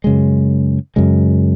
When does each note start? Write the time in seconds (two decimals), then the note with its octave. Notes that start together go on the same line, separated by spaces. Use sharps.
0.04 F#2 C#3 G#3
0.96 F#2 C#3 G#3